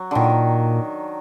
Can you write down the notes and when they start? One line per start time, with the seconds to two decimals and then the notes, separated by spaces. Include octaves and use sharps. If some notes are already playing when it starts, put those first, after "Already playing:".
Already playing: F#3
0.11 A#2 D3 D#3